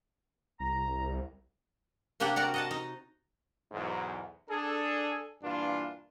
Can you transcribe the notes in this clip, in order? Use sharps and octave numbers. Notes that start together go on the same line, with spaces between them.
C2 A#5
C3 A#3 D4 G4 F#5 G5
F#4 A#4 D5 F#5
D#5 F#5 A5
D#4
B1 E2 G#2
D4 G#4 A4
G2 A#2 E3 A#3 D4 F4